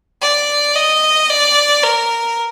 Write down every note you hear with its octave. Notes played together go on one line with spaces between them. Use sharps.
D5
D#5
D5
A#4